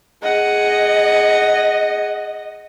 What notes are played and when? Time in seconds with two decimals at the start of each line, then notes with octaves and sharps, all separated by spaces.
0.23 G#4 D#5 F#5